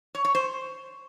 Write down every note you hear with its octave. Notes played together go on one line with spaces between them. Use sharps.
C#5
C#5
C5